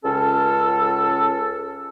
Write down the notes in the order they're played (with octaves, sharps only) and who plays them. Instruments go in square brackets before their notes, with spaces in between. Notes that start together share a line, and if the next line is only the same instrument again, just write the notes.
[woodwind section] C#2 C#4 A4